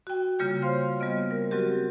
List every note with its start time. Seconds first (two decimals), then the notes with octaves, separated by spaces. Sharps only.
0.07 F#4 G5
0.39 C#3 G3 A#3 F4 G6
0.62 C5 C#5 F5 C6
0.99 G3 A#3 B3 D#5 F6
1.31 A#4
1.51 F#3 C4 F#4 G4